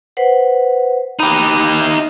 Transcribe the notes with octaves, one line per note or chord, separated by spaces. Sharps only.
B4 C5 F#5
D#4 G4 B5
D#5 E5